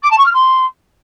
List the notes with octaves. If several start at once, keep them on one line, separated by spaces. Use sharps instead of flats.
D6
A5
C#6
F6
C6